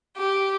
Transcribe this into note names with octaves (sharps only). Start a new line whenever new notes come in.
G4